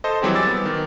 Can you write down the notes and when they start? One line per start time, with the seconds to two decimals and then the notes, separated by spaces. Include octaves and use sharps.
0.04 A4 C5 D#5
0.22 E3 F#3 G3 C4 G4 G#4
0.35 D6 E6 A6
0.47 B3
0.65 D#3